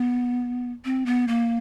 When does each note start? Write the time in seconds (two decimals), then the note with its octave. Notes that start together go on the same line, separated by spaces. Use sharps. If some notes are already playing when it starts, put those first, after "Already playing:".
Already playing: B3
0.85 C4
1.06 B3
1.28 A#3